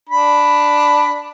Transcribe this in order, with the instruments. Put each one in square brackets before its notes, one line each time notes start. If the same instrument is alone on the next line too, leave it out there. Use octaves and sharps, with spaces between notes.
[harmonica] D4 B5